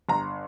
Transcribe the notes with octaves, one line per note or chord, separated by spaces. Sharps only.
G1 A#5